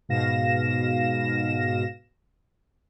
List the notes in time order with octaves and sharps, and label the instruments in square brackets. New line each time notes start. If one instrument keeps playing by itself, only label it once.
[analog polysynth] G#2 B2 F5 A#6 E7